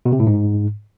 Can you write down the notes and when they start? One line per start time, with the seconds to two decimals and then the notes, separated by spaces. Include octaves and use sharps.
0.06 B2
0.13 C3
0.20 A2
0.27 G#2